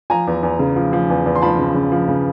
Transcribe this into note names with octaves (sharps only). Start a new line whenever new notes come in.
F3 G#5 A#5
E2
E2
C#3
F3
F3
E2
E2
C6
F3 A5 B5
C#3
C#3
F3
C#3